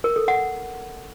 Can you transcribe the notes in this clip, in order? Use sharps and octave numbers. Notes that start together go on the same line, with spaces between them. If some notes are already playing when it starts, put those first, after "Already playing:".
A#4
A4
F#5